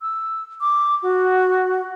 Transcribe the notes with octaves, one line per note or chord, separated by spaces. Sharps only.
E6
D6
F#4